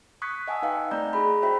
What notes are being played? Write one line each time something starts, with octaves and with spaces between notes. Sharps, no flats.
C#6 D#6 F#6 G#6 B6 C#7
D#5 F#5 G#5 A5 D#6 E6
D#4 B4 F5 G5
A3 C4 D5 D#5 A#5 G6
E4 G#4 B5
E4 F#4 C5 E5 G5 B5